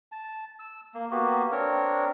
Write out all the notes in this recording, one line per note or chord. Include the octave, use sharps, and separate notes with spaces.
A5
E6
A#3
A#3 B3 F#4 G4
C4 D4 A#4 C#5